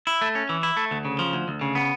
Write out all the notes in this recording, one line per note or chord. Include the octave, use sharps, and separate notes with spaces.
E4
A3
C#4
E3
E4
A3
D2
C#3
F3
D2
D2
C#3
B3